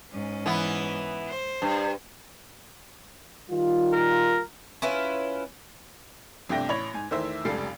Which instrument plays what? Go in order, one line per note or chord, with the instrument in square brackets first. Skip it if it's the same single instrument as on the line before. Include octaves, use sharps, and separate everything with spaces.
[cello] G#2 C#4
[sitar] E3 B3
[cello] C5
[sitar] G2
[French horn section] D#3 G3 F4
[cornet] A#4
[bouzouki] C#4 E4 F4 B4
[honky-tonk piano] G1 C3 A3 D4 G5 A#6
A1 C#5 B5 G#6 F7
G#2 G#5
E2 D#3 A3 C5 E5
F1 C#2 G3 A4 C7